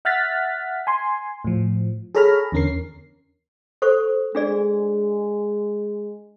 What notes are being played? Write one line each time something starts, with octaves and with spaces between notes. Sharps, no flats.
E5 F#5 F6 F#6 A6 B6
G#5 C6
A2 F3
G#4 A4 C#5 A#5 B5 F6
E2 D3 C#4 A#4 C7
A4 C5 C#6
G#3 D4 G#4 D5